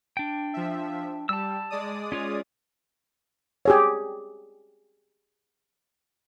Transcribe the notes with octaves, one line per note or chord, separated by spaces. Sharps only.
D4 G5
F3 E5
G3 A5 E6
G#3 D5 D#6
C#4 F4 C#5
G4 G#4 C#5